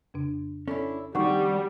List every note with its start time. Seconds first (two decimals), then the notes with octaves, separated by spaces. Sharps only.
0.14 F2 C#3 D4
0.68 C#4 D4 E4 A4
1.15 D#3 F3 G3 C4 D4 D#4 F#5 C#6